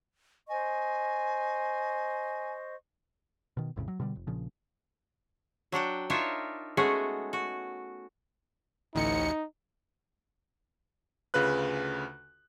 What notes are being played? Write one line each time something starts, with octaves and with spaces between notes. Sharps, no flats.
C5 D#5 G#5 C#6
B2 D#3
A#1 F2 A2 C#3
F#3
B2 D3 E3 G3
F1
A#1 A#2 C#3 F3
F#3 D4 F#5 G5
D4 D#4 F4 A#4 C#5 E5
G#3 A3 B3 C#4 F#4 G#4
F#4
A1 D2 D#4 C#7
D2 C#3 F4 B4 F#6